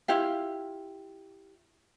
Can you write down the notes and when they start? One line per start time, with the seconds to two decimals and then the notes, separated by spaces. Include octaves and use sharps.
0.08 E4 F4 G4 F5